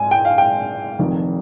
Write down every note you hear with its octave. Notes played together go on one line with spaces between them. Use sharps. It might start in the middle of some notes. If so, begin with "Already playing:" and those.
Already playing: G#2 G#3 G#5
G5
F5
G5
F1 F2 D#3